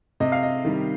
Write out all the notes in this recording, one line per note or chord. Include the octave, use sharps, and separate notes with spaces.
C3 D#5
F5
D#5
D#3 G3